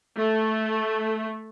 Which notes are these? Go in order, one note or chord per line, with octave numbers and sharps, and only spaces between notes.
A3